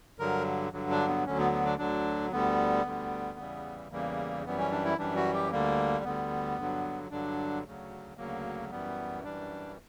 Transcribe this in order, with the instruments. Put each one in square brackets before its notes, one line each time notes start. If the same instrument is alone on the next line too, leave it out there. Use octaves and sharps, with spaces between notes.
[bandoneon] G2 D3 F#3 A#4
G2 D3 F#3
D4
B3
D2 D3 F#3 C#4
B3
B3
D4
D2 D3 F#3 D4
D2 D3 G3 B3
D2 D3 G3
E2 C#3 E3 G3
E2 C#3 E3 G3 A#3
F#2 E3 G3 B3
C#4
D4
E4
F#2 E3 G3 D4
F#4
G4
D2 D3 G3 A#3
D2 D3 G3 B3
G2 D3 F#3
G2 D3 F#3 D4
D2 C#3 F#3
D2 C#3 F#3 A#3
F#2 E3 G3 B3
F#2 E3 G3 D4